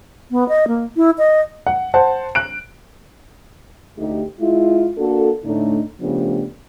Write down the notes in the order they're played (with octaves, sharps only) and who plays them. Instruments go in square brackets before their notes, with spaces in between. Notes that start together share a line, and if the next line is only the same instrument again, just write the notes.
[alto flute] B3
D#5
A#3
E4
D#5
[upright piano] F#5
C5 F#5 A5
F#6 D7
[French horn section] D2 A3 D#4 G4
G#3 E4 F4
A#3 D4 F#4 A4
A2 D3 A3 D4 D#4
C#3 F3 A3 B3 D4 G4